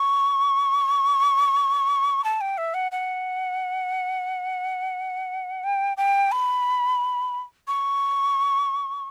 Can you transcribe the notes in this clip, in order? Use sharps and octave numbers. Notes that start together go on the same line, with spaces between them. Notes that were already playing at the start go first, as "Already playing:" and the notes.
Already playing: C#6
A5
G5
E5
F#5
F#5
G5
G5
B5
C#6